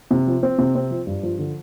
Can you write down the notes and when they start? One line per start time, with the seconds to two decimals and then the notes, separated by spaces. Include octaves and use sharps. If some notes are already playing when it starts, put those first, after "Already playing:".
0.11 C3
0.27 F3
0.43 C4
0.58 C3
0.75 C4
0.91 F3
1.07 G2
1.23 F3
1.39 D3